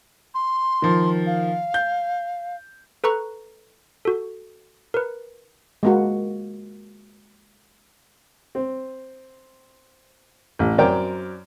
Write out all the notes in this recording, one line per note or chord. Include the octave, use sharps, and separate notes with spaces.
C6
D#3 F3
F5
G6
A4 B4 A#5 C#6 F#6
F#4 A4
A#4 B4
G#3 A#3 F#4
C4
A1
F#2 F#3 C4 A#4 D5 G5